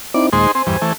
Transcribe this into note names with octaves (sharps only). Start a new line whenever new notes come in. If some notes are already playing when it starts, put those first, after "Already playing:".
C4 D#4 E4 D5
D#2 A#2 G#3 D#4 G#4 C5
C4 C5 G#5
E2 G2
E3 A3